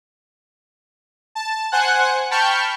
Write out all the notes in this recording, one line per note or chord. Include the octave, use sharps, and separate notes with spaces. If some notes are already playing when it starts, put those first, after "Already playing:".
A5
C5 F#5 G#5 F#6
G5 A5 B5 C#6 F6 G6